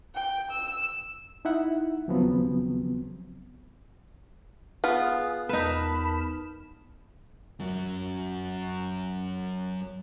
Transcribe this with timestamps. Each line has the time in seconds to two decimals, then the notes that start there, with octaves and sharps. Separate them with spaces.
0.15 G5
0.51 E6
1.45 D#4 E4 E5 F#5
2.08 D#2 C#3 F3 F#3 B3 C4
4.84 B3 F4 G#4
5.49 E2 D#4 A#4 B4 A5 B5
7.60 F#2 F#3